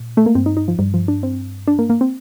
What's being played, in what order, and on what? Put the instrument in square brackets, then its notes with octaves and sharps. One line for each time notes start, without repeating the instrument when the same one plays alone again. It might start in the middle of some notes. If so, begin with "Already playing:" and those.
Already playing: [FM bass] A#2
[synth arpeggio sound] A3
A#3
[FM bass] G2 [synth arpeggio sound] C4
[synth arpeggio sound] D#4
D#4
F3
[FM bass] G2 [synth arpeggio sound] G3
[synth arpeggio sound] F3
D4
C4
D4
A#3
A#3
C4